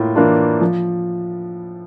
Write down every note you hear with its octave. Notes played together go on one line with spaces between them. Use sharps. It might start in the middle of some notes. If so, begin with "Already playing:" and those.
Already playing: A2 A#3 F4
E3 A#3 D4 F4
F3